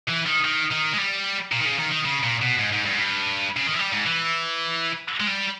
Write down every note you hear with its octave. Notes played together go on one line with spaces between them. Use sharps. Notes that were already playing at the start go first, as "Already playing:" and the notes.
E3
D#3
D#3
D#3
G#3
G3
A#2
D#3
C#3
D#3
D#3
C#3
A#2
B2
G#2
G#2
G2
G#2
G2
C#3
D#3
E3
G3
G#2
E3
G#3
G3